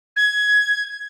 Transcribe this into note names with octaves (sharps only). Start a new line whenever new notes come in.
G#6